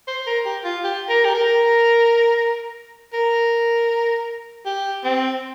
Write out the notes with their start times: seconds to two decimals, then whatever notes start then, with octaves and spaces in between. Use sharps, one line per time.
0.08 C5
0.27 A#4
0.46 G4
0.64 F4
0.84 G4
1.09 A#4
1.25 G4
1.35 A#4
3.13 A#4
4.66 G4
5.04 C4